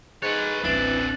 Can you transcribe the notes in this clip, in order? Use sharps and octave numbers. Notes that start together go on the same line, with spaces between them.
G#2 B4 C#5 F#6 A6
D1 A1 E3 C4 D4 A6 E7 F#7